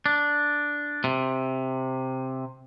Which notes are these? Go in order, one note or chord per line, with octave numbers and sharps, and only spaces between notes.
D4
C3